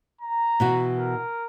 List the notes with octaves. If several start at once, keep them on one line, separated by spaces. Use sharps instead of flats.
A#5
B2 E3 F#4
A#4